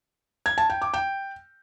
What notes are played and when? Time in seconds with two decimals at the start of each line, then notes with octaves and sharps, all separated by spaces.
0.46 G#6
0.58 A5
0.70 G5
0.82 D6
0.94 G5